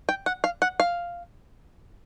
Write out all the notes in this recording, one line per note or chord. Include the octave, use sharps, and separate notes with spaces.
G5
F#5
F5
F#5
F5